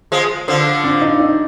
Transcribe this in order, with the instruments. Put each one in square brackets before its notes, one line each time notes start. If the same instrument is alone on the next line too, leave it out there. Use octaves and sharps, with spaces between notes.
[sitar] F3 G#3
D3 F3
[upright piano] D4
D#4
D#4